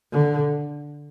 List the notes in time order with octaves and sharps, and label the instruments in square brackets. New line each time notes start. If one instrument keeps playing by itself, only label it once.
[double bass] D3